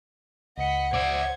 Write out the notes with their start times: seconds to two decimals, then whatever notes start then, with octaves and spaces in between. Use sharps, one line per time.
0.58 C#2 D#5 F#5 B5 C#7
0.94 C5 D5 E5 G#6